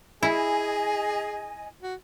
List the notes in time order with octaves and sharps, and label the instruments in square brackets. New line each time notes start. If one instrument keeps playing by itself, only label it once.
[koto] E4 [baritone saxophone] G#4 [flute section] D#5 G#5
[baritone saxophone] F#4